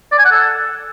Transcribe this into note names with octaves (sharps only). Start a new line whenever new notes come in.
D5
G#5
F#5
A4